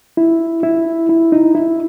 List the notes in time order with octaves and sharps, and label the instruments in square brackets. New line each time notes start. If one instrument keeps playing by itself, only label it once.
[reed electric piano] E4
E4
E4
D#4
E4